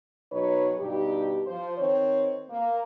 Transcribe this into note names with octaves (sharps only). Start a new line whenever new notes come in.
B2 F#3 D#4 B4 C#5
G2 B2 D#4 G4
F3 C5
D#3 C4 C#5
A#3